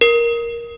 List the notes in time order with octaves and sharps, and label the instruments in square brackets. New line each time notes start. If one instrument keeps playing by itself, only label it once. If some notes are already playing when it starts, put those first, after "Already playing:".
[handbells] A#4